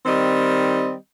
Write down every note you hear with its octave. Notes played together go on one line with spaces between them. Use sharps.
D#3 G3 C4 D#5